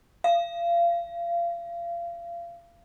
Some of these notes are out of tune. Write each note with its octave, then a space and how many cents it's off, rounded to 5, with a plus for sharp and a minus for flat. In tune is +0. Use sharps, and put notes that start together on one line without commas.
F5 -30